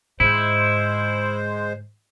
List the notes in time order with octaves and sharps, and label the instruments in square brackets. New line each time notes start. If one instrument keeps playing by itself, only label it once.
[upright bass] G#2 D3 [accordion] G#3 C5 [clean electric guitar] E4